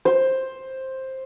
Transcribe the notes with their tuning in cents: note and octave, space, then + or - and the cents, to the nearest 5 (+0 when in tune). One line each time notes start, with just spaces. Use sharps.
C5 +10